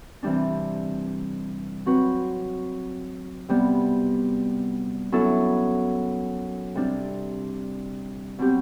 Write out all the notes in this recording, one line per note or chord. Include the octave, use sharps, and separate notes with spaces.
C3 E3 G3 D4
F#3 C4 F#4 B4
C3 G3 B3
F#2 F#3 B3 E4 A4
C3 G3 D4
B2 F#3 C4 G4